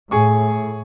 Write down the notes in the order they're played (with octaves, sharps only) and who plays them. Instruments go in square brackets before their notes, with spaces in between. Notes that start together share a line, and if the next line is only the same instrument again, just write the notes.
[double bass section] A2 [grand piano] G#4 G#5 C#6